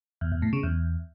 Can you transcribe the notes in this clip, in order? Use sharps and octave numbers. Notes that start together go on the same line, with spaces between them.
E2
E2
A2
C#3
E2